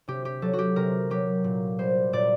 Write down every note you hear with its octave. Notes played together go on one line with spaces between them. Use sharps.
C3 G4
G4
F#3 A4
F#4
G4
C3 A#4
F#3 G4
A#2
G3 C5
A#2 D5